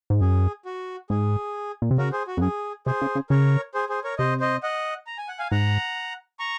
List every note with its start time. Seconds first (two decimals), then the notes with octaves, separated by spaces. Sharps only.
0.10 G#2
0.21 F#2 G#4
0.65 F#4
1.10 G#2 G#4
1.82 A#2
1.91 C3
1.98 C#3 F#4 A#4
2.12 G#4 C5
2.27 F#4
2.37 F2
2.42 F#2 G#4
2.86 C3 G#4 C5
3.02 C#3
3.15 C#3
3.30 C#3 A#4 C#5
3.74 G#4 C5
3.89 G#4 C5
4.04 A#4 C#5
4.18 C3 C5 D#5
4.40 C5 D#5
4.63 D#5 F#5
5.07 A#5
5.18 G#5
5.28 F#5
5.39 F5 G#5
5.51 G#2 F#5 A#5
6.39 A#5 C#6